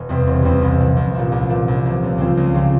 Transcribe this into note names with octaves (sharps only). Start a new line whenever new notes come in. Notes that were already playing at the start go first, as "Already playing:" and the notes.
Already playing: E1
E2 C3 G3 C4
E1
E2 C3 G3 C4
C2
A#2 F3
C2
A#2 F3
C2
A#2 F3
C2
A#2 F3
C#2
C#3 G3 C4 F4
C#2
C#3 G3 C4 F4